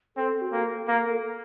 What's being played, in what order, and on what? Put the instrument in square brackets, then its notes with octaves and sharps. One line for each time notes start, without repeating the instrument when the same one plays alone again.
[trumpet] C4 [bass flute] A4
[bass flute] F#4
[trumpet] A#3
[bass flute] A4
[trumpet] A#3 [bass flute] A#4
[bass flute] A4